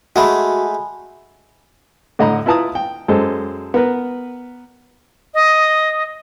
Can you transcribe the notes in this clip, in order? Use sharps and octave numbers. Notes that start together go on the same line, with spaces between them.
G#3 A3 F#4 G#5 B5
A2 D3 D#5 F#5 A#5 B5
E4 F4 B4 A5 A#5 D#6
G5
F#2 G#3 A4 C5
B3 A#4 B4
D#5